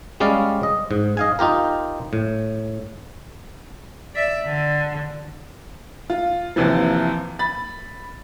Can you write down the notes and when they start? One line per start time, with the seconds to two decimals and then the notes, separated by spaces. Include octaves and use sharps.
0.20 G3 G#3 C#4 D5 F5
0.63 D#5
0.91 G#2
1.17 D#5 F5 G#5
1.39 D#4 F4 G4 A#4
2.13 A2
4.14 D5 E5
4.44 D3
6.10 F4
6.56 D#2 C3 E3 F3
7.39 B5 A6